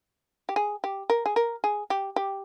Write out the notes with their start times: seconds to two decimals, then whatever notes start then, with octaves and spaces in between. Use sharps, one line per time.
0.49 G4
0.56 G#4
0.84 G4
1.10 A#4
1.26 G#4
1.36 A#4
1.64 G#4
1.90 G4
2.16 G4